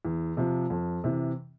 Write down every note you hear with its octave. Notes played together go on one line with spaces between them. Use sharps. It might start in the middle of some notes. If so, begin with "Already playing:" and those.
E2
C3 F3
F2
C3 E3